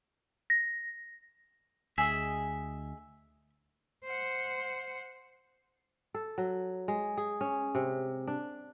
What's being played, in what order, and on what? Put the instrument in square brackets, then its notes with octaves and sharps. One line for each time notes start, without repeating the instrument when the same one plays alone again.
[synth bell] A#6
[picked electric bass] D2 [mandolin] G#4 D#5 [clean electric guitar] E5
[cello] C5 F#5
[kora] A4
F#3
G#3
G#4
C#4
C3
D4